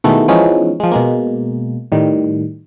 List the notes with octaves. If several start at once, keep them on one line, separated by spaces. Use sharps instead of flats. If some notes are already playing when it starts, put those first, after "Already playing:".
B2 D#3 E3 G#3 A3 B3
E3 F3 G#3 B3 C#4 D#4
F3 G#3
B2 G#3 A#3
A2 D#3 G3